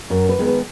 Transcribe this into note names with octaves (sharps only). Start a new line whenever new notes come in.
F#2 A#4
B4
D#3 G#3 B3
B4